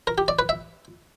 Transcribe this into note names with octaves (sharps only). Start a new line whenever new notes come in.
A#4
G4
D5
B4
E5